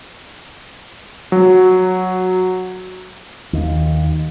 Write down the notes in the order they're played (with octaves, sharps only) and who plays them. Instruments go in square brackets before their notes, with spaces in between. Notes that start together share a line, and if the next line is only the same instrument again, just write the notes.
[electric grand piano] F#3
[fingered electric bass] D#2